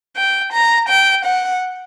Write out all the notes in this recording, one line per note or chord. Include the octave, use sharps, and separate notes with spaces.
G5
A#5
G5
F#5